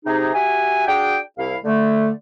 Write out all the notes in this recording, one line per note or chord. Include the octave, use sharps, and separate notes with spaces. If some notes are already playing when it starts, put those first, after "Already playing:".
C3 D#4 G#4
F#4 G4 E5 G#5
D4 F#4 G#4 G5
C2 E4 F5
D3 A3